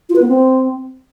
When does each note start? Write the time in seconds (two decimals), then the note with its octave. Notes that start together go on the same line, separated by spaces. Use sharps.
0.09 F4
0.16 B4
0.22 B3
0.28 C4